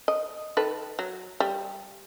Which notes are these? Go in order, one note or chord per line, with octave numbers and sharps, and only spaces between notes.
D#5
D#3 A4 B4
F#3
G3